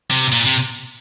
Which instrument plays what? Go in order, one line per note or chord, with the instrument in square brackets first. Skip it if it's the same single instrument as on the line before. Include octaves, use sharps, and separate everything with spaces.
[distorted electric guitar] C3
A#2
C3